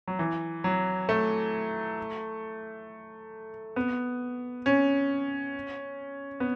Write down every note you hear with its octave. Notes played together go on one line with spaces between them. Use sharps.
F#3
E3
F#3
A3
B3
C#4
B3